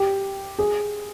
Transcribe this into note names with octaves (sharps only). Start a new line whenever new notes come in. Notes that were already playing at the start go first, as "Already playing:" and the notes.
Already playing: G4
G#4